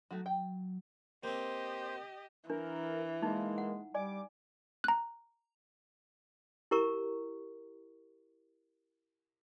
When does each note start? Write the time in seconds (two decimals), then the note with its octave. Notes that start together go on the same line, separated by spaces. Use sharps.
0.11 F#3 A3 D#4 F#4
0.26 G5
1.24 A#3 C4 G4 C5 D#5
2.50 E3 D4 A#4
3.22 G#3 A#3 D#4
3.58 F#5
3.94 G3 D5 G#5 D6
4.84 A#5 F#6
6.71 E4 G4 A#4 A#5 C#6